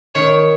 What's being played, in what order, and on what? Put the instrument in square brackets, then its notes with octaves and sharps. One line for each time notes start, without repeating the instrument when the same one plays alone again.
[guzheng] D#3 [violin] C#5